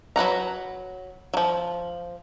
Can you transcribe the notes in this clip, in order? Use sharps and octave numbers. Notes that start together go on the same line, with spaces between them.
F#3 B4 F#5 A#5
F3 F#3